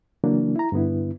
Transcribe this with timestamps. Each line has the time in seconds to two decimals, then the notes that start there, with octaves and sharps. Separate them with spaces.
0.24 C#3 E3 F#3 A#3 D4
0.56 E4 A#5
0.72 G2 D3 B3 E4